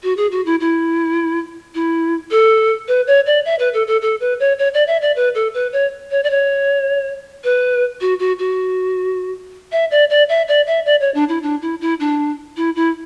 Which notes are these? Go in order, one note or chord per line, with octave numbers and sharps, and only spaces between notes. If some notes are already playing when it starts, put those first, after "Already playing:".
F#4
G#4
F#4
E4
E4
E4
A4
B4
C#5
D5
E5
B4
A4
A4
A4
B4
C#5
C#5
D5
E5
D5
B4
A4
B4
C#5
C#5
D5
C#5
B4
F#4
F#4
F#4
E5
D5
D5
E5
D5
E5
D5
C#5
D4
E4
D4
E4
E4
D4
E4
E4